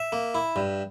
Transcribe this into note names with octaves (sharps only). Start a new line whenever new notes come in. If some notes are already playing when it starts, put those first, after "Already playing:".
Already playing: E5
A#3
E4
G2